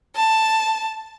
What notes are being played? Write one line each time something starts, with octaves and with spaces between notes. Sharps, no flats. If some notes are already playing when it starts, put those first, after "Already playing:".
A5